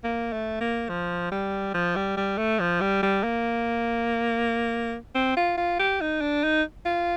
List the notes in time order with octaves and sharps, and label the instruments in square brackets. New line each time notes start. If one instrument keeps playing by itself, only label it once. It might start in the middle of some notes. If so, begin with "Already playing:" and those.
[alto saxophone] A#3
A3
A#3
F3
G3
F3
G3
G3
A3
F3
G3
G3
A#3
C4
F4
F4
G4
D#4
D4
D#4
F4